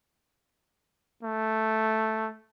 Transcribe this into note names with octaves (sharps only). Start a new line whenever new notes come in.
A3